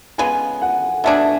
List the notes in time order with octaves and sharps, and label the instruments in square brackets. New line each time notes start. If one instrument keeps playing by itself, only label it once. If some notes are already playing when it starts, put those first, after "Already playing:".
[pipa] C#3 G#3 B3 [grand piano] G#5
[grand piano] F#5
[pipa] B2 A3 D4 G#4 [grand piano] E5